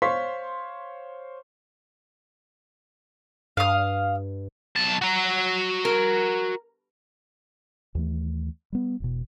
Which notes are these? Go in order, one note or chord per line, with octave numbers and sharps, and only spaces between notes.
C5 C#5 F5 C6 C#6 B6
G2 F5 D#6
B1 A5
F#4 A#5
A#4
D#2 E3 A3
G3 B3
E1 B2